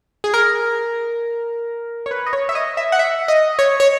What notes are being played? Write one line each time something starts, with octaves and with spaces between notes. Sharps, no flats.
G#4
A#4
C#5
B4
D#5
C#5
E5
D#5
E5
F#5
E5
D#5
C#5
C#5